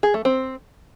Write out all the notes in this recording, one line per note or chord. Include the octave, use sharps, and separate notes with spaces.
G#4
A3
C4